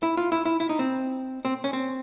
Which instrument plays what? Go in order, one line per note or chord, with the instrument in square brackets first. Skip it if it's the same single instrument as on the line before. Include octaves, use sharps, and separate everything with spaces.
[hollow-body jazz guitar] E4
F4
E4
E4
E4
D#4
C4
C4
C#4
C4